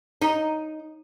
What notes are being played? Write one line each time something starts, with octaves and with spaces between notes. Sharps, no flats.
D#4